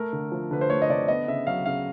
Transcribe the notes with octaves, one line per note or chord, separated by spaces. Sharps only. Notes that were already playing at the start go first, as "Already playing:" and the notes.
Already playing: A3 A#4
D3
F3
D3 B4
C5
A3 C#5
D#5
D3 D5
B3 D#5
C#3 E5
F#3 F5
C#3 F5